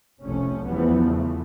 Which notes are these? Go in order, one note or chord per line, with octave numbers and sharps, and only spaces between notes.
F1 C2 C3 F3 A3 C#4
E2 E3 F3 G3 B3
C#3 A3